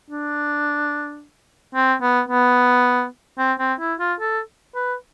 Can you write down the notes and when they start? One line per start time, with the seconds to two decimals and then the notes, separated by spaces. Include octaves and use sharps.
0.10 D4
1.75 C4
2.02 B3
2.29 B3
3.38 C4
3.59 C4
3.79 E4
3.99 F4
4.20 A4
4.75 B4